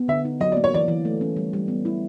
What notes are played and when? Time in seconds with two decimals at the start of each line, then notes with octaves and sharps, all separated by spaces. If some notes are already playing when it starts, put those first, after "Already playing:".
Already playing: B3
0.08 D3 E5
0.25 D#4
0.40 F#3 D#5
0.52 A#3 D5
0.64 C#5
0.73 E3 D5
0.88 E3
1.05 A3
1.21 C#4
1.36 G3
1.53 G3
1.68 B3
1.85 E4